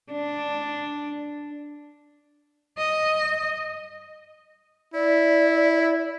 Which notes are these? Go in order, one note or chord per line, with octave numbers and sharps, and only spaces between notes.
D4
D#5
E4 D5